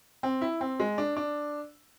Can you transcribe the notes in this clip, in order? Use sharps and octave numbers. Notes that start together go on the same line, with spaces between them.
C4
E4
C4
G#3
D4
D4